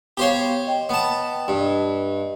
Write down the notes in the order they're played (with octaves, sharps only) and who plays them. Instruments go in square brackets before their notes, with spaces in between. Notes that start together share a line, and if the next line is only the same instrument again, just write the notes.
[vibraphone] B3 F5 [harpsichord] G4 C5 C#5
[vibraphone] D#5 G5
[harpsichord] B3 A5
[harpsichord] G2 [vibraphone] D5
[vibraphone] D#5